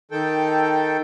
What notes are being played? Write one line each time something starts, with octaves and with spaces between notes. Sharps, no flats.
D#3 A4 G5